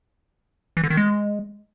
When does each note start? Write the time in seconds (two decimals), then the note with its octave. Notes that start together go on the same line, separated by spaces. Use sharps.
0.77 E3
0.84 D3
0.90 D#3
0.97 G#3